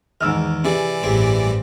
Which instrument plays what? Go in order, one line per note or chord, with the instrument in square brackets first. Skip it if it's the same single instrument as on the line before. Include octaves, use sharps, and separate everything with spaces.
[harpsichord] E2 D#3 [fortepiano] G#2 E6 F6
[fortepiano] C3 [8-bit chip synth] E3 D5 [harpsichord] G#4
[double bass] A1 G2 [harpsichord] G3 C4 G#4